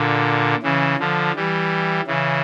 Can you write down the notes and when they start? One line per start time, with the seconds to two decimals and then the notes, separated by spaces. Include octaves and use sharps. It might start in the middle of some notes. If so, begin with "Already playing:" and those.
Already playing: A#2 D3
0.62 C#3 E3
0.99 D3 F3
1.36 E3 G3
2.07 C#3 E3